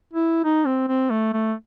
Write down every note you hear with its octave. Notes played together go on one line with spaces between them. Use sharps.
E4
D#4
C4
C4
A3
A3